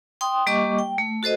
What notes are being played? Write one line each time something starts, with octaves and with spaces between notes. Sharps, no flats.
G5 C6 D#6
G3 A#3 G4 D#5 C#6 D6
G5
A3
F#4 A4 C5 D#5